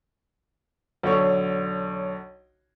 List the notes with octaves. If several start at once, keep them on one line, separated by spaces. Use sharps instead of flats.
B1 D3 C#5 C#6